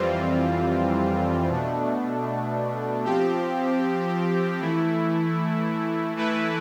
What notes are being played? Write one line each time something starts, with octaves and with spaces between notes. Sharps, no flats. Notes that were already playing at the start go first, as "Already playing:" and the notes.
Already playing: F2 E3 G3 C4 F4
B2 A3 D4
F3 C4 G4
E3 A3 E4
E3 A3 E4 B4